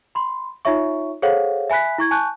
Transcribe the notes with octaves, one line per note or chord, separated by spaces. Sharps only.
B5 C6
D#4 F4 C#5 E5 C#6
G#4 A4 C5 C#5 F5 F#5
E5 G#5 B5 F#6 B6
E4 C#6 G#6
G#5 A5 C#6 F#6 G6